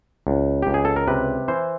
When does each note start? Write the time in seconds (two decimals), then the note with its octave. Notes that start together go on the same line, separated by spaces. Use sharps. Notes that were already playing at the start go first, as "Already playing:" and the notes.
0.27 C#2
0.63 C#2 G4
0.74 G#4
0.85 A4
0.96 A#4
1.08 C3 B4
1.48 E3 C5